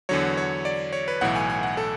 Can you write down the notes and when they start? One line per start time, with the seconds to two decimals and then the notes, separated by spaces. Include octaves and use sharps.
0.09 E2 D3 F#3 C#5
0.37 C#5
0.65 D5
0.93 C#5
1.08 B4
1.21 B1 A2 E3 F#5
1.36 G#5
1.50 G#5
1.63 F#5
1.77 A4